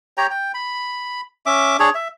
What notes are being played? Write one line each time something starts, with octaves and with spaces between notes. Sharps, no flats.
G4 C#5 G5 A#5
G5
B5
C#4 E5 D6
D4 G#4 C#5
E5